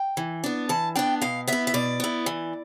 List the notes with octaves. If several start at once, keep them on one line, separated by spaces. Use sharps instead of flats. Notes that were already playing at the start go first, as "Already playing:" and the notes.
Already playing: G5
E3
B3 D4
E3 A5
B3 D4 G5
B2 F5
B3 E4 E5
E5
B2 D5
B3 E4
E3